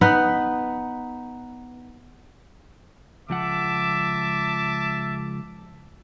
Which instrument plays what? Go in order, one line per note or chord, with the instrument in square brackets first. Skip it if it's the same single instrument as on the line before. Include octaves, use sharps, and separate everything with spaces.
[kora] B3 D#4 B4
[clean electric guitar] C#2 F3 F#5 [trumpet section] E5 A5 D6